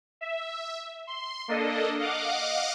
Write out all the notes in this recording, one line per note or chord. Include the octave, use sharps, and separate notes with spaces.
E5
C6
A#3 D4 A4 D#5
D#5 F5 F#5 D6